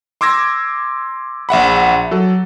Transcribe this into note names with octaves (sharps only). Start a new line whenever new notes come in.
C6 D6 E6 G#6 A#6
A#1 E5 F#5 B5
F#3 A4